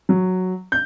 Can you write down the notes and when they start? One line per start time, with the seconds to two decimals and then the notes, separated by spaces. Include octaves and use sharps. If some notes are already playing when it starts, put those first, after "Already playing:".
0.09 F#3
0.72 G6